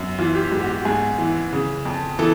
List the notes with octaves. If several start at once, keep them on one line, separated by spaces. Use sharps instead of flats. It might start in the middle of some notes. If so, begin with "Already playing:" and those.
Already playing: F#2
E3 F4
G4
G#2 G4
F#4
G4
G#2 G#4
E3
C#3
F2
E3 A4